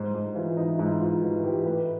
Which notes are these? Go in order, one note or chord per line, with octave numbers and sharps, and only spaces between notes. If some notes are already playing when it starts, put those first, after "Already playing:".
Already playing: G#2 C5
G#2
E3 F4
E3 D#4
G#2 E4
G#2 F4
E3 F#4
E3 G4
A2 B4